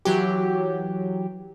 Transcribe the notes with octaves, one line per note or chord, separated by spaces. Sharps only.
E3 F#3 G4